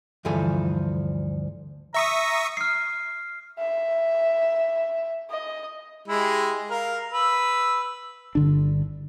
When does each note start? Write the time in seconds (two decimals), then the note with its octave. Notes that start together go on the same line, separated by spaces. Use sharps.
0.25 D2 G2 E3 F3 A4 G#5
1.94 E5 A#5 C#6 D#6
2.57 F6 C7
3.58 E5
5.30 D#5
6.08 G#3 E4 G4
6.71 A#4 F5
7.12 B4 E6
8.35 G1 D3 D4